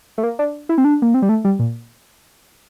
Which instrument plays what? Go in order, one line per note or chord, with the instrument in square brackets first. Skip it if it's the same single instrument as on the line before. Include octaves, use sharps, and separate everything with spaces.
[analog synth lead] A3
A#3
D4
E4
C4
D4
A#3
C4
G3
A3
G3
A#2